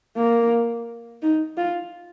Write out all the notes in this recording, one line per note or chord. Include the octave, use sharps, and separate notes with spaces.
A#3
D#4
F4